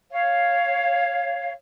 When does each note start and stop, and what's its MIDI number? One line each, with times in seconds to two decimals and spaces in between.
0.10 1.52 73
0.10 1.52 77